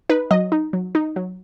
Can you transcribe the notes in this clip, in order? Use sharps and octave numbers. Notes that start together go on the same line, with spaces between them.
D#4 B4
F#3 D#5
D#4
F#3
D#4
F#3